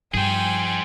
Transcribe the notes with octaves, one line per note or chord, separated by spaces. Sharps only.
G2 F3 G#4 C5 G5 G#5